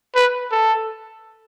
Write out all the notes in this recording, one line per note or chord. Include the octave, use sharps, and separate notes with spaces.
B4
A4